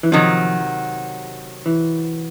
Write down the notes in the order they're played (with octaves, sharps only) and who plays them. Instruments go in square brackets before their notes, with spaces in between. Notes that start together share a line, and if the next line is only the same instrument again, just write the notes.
[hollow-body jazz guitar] E3
[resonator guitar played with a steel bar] C3 D#3 F#3 [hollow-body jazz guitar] F3
[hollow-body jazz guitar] E3